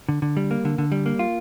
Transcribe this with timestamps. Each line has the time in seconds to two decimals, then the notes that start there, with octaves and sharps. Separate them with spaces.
0.09 D3
0.22 D3
0.37 G3
0.51 A#3
0.65 D3
0.78 D3
0.92 G3
1.06 A#3
1.19 F4